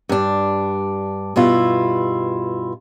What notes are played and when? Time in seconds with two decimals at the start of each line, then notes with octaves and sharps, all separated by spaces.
0.09 G2 D4
1.36 G2 B2 E4 F4